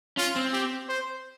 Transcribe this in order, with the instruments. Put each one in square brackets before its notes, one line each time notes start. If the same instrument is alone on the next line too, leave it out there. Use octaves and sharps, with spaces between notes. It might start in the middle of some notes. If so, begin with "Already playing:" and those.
[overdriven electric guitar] C#4 [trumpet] F4
[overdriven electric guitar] C4
[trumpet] G4
C5